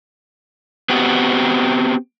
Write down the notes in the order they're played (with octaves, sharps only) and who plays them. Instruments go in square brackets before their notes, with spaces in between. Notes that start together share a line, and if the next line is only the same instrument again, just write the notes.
[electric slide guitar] B3 C4 F#4 G4